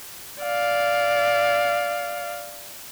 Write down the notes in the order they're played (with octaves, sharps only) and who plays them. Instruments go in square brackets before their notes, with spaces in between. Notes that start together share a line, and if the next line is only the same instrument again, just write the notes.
[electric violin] D5 F5